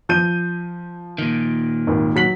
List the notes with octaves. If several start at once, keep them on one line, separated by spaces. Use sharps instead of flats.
F3 G6 D#7
A#2 D#3
G#1 D#2
F#3 B6 F#7